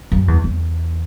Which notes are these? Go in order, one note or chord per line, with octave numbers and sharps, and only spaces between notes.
F#2
E2
E2